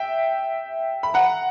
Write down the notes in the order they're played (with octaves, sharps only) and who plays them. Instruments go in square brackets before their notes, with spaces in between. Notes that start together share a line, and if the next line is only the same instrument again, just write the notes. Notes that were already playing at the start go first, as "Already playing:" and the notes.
Already playing: [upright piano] E5 G5
B5
F#5 A#5